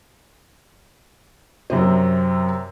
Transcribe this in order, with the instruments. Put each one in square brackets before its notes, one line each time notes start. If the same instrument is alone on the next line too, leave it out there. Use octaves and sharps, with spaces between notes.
[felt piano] F#2 C3 C4